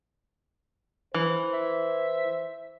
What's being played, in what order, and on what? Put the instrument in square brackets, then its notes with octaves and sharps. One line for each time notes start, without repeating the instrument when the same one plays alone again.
[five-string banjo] E3 [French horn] C5
[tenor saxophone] E5